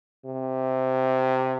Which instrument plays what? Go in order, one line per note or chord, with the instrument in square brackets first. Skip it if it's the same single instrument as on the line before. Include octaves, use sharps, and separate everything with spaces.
[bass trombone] C3